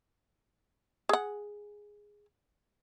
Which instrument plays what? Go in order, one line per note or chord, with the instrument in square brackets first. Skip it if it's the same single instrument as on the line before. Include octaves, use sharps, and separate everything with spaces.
[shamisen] G#4 F#5